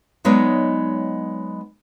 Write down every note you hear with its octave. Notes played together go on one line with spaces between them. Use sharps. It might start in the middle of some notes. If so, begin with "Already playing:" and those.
F#3 G#3 B3 D#4 C#5 D5